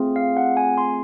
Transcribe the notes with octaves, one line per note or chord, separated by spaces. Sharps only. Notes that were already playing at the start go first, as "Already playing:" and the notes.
Already playing: A3 C4 F4 G#4
F5
F#5
G#5
C6